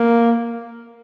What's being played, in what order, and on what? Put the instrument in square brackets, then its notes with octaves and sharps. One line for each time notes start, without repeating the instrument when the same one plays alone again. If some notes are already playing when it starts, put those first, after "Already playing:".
Already playing: [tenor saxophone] A#3